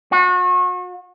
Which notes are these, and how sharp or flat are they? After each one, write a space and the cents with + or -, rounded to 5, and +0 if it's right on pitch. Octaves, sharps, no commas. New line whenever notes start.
F#4 -35